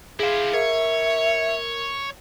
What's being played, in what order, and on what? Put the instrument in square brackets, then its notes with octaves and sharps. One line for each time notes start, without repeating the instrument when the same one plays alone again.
[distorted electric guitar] E4 C5 [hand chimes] G#4 F5
[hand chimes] A#4 [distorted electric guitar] C#5 [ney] E5